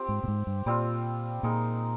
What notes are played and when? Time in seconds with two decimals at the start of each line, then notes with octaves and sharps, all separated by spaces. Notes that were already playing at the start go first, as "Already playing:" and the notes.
Already playing: C4 F4 G4 C5
0.09 G#2
0.23 A#2
0.28 G#2
0.47 G2
0.66 A#2 G3 C4 F4
1.43 A#2 G#3 D#4 A#4